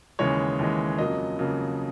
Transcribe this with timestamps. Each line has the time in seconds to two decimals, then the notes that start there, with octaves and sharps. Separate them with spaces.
0.19 D#2 C#3 E3 G#3 C#5
0.59 D#2 C#3 E3 G#3
0.98 F2 C#3 F#3 A#3 D#5
1.39 F2 C#3 F#3 A#3